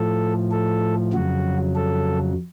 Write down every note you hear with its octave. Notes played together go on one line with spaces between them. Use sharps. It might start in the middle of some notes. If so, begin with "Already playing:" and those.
Already playing: A2 F3 A4
A4
F2 C#3 F#3 F#4
A4